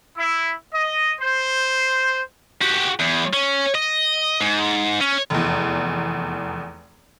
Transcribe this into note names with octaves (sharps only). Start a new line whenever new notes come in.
E4
D#5
C5
F#4 G4
E2
C#4
D#5
G#2
C#4
F1 E2